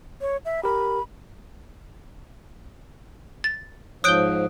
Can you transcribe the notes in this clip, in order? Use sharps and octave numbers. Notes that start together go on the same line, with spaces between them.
C#5
E5
G4 A#4 B5
A6
G#2 F3 C#5 D#6 F#6 G6 D7 G7